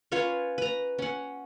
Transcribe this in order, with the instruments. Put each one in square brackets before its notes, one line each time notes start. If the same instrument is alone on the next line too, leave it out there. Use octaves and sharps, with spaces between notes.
[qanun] C#4 F4 B4 C#5
B4 A#5
C#4 F#5